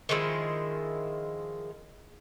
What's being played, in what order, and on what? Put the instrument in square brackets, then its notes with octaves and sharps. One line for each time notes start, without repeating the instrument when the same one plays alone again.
[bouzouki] D#3 F3 G#3 E4